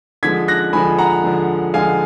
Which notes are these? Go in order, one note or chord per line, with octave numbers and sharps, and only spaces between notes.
D3 F3 G#3 G#6 B6
F#6 A#6
D3 F3 G#3 G#5 B5
F#5 A#5
D3 F3 G#3
D3 F3 G#3 F5 G#5